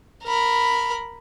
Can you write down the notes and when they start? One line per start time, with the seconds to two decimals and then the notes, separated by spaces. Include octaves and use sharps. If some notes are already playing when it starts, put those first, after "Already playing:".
0.24 A#4 B5